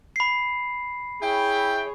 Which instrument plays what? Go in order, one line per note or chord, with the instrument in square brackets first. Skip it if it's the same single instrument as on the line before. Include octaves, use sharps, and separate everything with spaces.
[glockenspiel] B5 C7
[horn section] E4 G5 [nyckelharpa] G#4 C#5